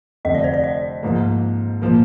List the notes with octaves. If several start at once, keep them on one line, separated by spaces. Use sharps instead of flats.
F1 F2 D3 D#5
D5
C5
D5
D#5
G#2 F3 A#3
A#2 F3 A#3